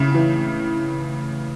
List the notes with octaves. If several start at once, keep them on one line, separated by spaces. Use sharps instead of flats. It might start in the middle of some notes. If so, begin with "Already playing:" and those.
Already playing: A2 C#3
E3